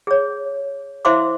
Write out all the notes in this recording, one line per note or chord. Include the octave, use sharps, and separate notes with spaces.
G#4 C#5
E4 C5 E5 F5 C6 D6